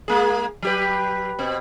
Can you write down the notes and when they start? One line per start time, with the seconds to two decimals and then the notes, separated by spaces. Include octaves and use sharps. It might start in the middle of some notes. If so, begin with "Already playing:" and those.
0.08 G#3 A#3 G#4
0.62 F#3 G4 B4
1.39 B2 C4